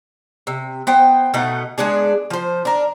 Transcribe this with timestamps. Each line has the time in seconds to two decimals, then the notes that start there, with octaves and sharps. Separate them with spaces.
0.47 C3
0.87 B3 C5 G5
1.34 B2 A3 D#4 F#5
1.78 G#3 B3 D4 G#4
2.30 F3 C5
2.65 D4 A#4